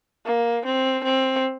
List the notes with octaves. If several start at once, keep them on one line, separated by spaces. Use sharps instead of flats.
A#3
C4
C4